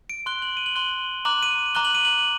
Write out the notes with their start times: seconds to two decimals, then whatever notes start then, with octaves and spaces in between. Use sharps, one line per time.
0.10 D7
0.26 C6 F#6 G7
0.42 F#7
0.57 D#7
0.66 F#7
0.75 C6 F#6 G7
1.25 A#5 D6 F#6 F#7
1.42 D#7
1.75 A#5 D6 F#6 G7
1.85 F#7
1.95 D#7
2.05 F#7